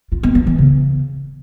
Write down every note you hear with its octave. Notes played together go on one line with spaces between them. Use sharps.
F4
B3
B3
E3
C#3